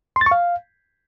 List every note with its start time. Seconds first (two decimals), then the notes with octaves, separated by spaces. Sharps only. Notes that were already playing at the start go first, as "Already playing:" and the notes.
0.16 C6
0.21 A6
0.26 C#6
0.31 F5